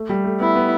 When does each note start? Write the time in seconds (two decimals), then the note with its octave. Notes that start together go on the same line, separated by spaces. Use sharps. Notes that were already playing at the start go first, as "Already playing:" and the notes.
Already playing: A3
0.09 G3
0.24 A3
0.40 B3 E4
0.55 B3